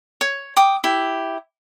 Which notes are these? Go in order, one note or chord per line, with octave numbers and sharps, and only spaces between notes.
C#5
G5 D6 D#6
E4 G4